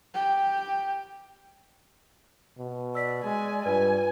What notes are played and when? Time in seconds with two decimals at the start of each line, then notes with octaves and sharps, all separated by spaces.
0.14 G4 G5
2.59 B2
2.95 D5 E6 B6
3.24 G#3 G#5
3.65 G2 F4 B4 G#5